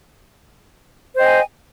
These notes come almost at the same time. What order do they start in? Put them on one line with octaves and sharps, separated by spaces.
C5 D#5 G5 G#5